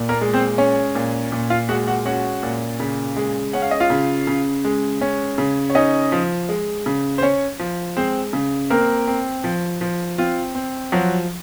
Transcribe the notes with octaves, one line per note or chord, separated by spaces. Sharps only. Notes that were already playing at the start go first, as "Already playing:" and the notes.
Already playing: A#2
A#3 A#4
G#3
C4 C5
C#4 C#5
A#2
A#2
F4 F5
G#3 F#4 F#5
F#4 F#5
C#4 F#4 F#5
A#2
C#3
G#3
C#4 F#5
F5
D#5
F4 F5
C#3
C#3
G#3
C#4
C#3
C#5
C#4 D#4 D#5
F3
G#3
C#3
C5
C#4 C#5
F3
G#3 C4 C5
C#3
A#3 C4 A#4
C4
F3
F3
C4 F4
C4
F3 F#3 F#4